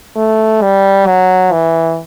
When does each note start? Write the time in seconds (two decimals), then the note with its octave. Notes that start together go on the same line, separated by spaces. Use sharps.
0.16 A3
0.62 G3
1.07 F#3
1.52 E3